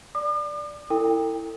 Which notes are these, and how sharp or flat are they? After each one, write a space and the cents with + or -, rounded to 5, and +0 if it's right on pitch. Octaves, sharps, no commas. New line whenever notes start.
D5 +0 D6 +45
E4 +0 A4 +40 G5 +25